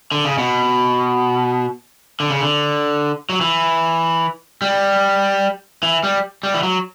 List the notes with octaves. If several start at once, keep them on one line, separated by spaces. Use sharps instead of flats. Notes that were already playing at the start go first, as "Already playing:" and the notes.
D3
C#3
B2
D3
C#3
D3
F#3
E3
G3
E3
G3
G3
E3
F#3